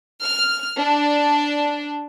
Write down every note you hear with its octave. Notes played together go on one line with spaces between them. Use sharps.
F6
D4